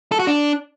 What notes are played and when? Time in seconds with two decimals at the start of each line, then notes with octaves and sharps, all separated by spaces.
0.12 A4
0.19 F#4
0.27 D4